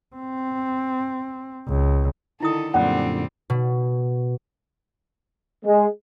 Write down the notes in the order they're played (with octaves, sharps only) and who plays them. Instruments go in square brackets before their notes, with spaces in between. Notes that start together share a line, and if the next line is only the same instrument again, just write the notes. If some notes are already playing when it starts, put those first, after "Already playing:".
[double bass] C4
C#2
[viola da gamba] D3 D#3 A4 [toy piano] D#4 E4 D#6
[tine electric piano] F#2 A#2 D3 [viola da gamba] G3 C4 [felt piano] F#5
[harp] B2
[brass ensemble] G#3